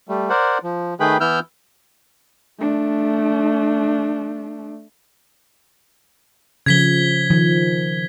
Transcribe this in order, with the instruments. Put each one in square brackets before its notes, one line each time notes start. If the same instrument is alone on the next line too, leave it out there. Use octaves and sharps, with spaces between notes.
[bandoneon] G3 A3
A#4 C5 D5 F#5
F3
D#3 A3 G#4 B4 G5 B5
E3 B3 E4 E6 F6 G6
[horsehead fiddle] A3 D4
[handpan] C#3 F3 [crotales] G#6 B6 G7
[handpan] D#3 F3